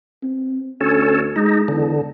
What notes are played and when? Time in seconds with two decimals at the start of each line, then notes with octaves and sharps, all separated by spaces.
0.23 C4
0.81 D2 C#4 A4
1.36 G#3 D#4
1.68 E2 D3